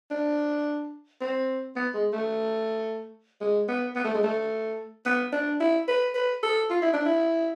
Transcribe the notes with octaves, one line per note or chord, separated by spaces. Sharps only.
D4
C4
B3
G#3
A3
G#3
B3
B3
A3
G#3
A3
B3
D4
E4
B4
B4
A4
F4
E4
D4
E4